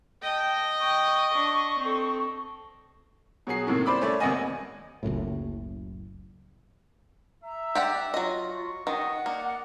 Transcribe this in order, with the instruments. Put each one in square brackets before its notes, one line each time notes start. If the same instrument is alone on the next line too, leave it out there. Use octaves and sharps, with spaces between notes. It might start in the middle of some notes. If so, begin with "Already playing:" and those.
[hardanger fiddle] D#5 [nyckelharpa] G5 A5
[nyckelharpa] G5 [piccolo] C#6
[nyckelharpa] D4
C4 A4
[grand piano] B2 F#3 G#4 C7
F#2 A2 C3 D#3 A#3
C5 D5 B5 D6
A3 C#4 D5
G#1 C3 A#3 B3 D#5 G#5
[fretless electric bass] F#1 C#2 F#2 A2
[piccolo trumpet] E5 [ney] A#5
[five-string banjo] G4 D5 F#5
[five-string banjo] F#3 D#5 [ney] F4
[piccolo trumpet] C#6
[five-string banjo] D#3 [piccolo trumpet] D#5 [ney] F#5
[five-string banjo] A#3 [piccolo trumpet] D5